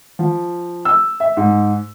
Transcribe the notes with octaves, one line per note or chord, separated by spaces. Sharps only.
F3
E6
E5
G#2